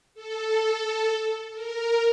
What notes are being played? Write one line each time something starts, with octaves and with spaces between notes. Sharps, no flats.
A4
A#4